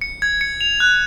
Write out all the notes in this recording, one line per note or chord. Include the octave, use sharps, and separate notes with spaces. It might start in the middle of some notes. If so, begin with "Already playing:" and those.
C#7
G#6
C#7
F7
F#6